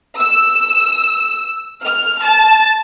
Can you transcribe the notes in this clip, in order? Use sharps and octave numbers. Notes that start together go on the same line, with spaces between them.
E6
F6
A5